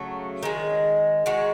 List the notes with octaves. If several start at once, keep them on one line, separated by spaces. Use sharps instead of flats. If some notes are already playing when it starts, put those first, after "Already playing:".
Already playing: C#3 F#3 A3
D#3 G#3
D#3 G#3 F#4